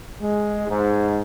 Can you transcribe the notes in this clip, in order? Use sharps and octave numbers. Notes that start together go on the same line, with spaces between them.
G#3
G#2